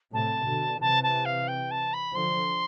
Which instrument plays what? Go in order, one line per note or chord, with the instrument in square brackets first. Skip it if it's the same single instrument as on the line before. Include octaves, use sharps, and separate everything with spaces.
[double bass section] A2 C3 [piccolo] A5
[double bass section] B2 D3
[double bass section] C3 E3 [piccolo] A5
[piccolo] A5
F5
G5
A5
B5
[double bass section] D3 F3 [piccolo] C6